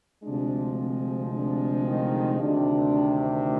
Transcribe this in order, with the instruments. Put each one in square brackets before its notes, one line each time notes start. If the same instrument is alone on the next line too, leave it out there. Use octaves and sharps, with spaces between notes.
[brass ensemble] D2 C3 F3 G#3 D4
C4
D4
D#3 D#4
D2 C3 D#3 D4